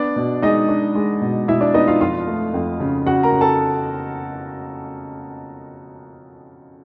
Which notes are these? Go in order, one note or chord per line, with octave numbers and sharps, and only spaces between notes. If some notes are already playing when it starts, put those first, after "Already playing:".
Already playing: B3 D4 D5
B2
G#3 D#4 D#5
D4
G#3
B2
B2 E4 E5
D4 D5
B3 D#4 D#5
F4 F5
F2 F4 F5
A3
F2
C#3
C#3 F#4 F#5
A#4 A#5
C#3
A4 A5